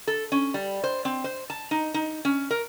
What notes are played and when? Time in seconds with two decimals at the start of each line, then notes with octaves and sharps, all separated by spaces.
0.07 A4
0.32 C#4
0.54 G3
0.84 C5
1.05 C4
1.24 C5
1.50 A5
1.71 D#4
1.94 D#4
2.25 C#4
2.51 A#4